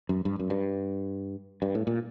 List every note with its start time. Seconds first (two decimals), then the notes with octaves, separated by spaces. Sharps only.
0.09 F#2
0.25 G2
0.39 F#2
0.50 G2
1.62 G2
1.75 A2
1.87 A#2